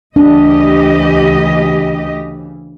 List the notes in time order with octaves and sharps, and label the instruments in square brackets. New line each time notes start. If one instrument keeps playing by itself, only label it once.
[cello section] D2 G4 D#5 [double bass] C#3 E3 [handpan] D4